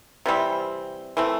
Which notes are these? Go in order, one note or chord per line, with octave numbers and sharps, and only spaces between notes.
C3 E3 G3 C4
E3 A3 C4